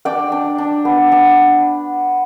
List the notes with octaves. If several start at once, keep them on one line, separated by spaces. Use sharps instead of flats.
D4 D5 G5
D4
D4
B3
D4